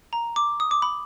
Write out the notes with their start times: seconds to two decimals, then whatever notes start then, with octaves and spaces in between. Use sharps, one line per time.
0.13 A#5
0.36 D6
0.60 D#6
0.71 D6
0.82 B5